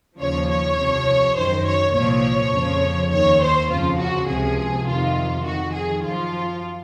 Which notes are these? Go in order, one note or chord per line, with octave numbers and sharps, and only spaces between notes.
D#2 C#3 F3 C#5
C#5
C2 C3 F3
F#2 D#3 C5
C#5
C2 A#2 F3 C#5
F2 C#3 F3
D#2 D#3 C#5
C5
F2 C#3 F3 F4
F#4
C#2 C3 F3 G#4
F2 C3 D#3 F4
F2 D#3 F#4
G#4
F#2 F3 F4